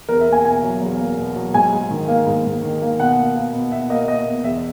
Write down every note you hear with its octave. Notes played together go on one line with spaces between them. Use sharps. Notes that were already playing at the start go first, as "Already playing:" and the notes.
E2 A#4
E5
A#3
G#5
B2 G#5
F#3
E2
A#3
B2
F#3
G#2 G#5
G#2
D#3
A#3
G#2
G#2
D#3
A#3
B2 F#5
A#3
A#3
B2
B2 E5
A#3 D#5
A#3 D#5
B2
E2 E5